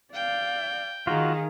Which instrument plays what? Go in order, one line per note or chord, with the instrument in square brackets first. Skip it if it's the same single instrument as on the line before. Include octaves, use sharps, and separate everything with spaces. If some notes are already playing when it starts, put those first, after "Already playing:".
[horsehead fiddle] D5 F5 [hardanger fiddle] G5
[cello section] D#3 [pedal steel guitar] F4 F#4 [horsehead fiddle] G#4 F5